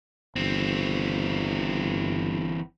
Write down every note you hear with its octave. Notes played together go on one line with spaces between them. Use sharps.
G1 E3 C4